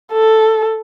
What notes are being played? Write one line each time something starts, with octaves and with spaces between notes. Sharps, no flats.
A4